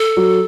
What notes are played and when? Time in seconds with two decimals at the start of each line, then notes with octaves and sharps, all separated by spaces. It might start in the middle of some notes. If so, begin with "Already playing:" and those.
Already playing: A4
0.17 F#3